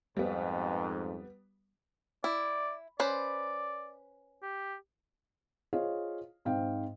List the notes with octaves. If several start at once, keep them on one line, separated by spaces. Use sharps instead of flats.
F2 G#2 G3 B3
E4 D5
C#4 B4 C5 D5
G4
F4 G#4 C5 C#5 D#5 F5
G#2 C4 F5 G5